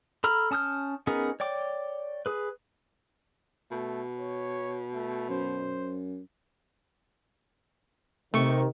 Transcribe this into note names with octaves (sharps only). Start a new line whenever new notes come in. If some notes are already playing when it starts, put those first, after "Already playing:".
A4 A#5 B5 F6
C#4 A5 D#6 F6 G6
B3 C#4 D#4 G#4 A#4
C#5 D5 G5 D6
G#4 B4
B2 A3
C#5
A3
F#2 C5
C3 D#3 A3 C#6